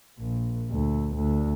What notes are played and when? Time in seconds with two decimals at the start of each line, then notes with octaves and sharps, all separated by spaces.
0.19 A#1
0.70 D2
1.16 D2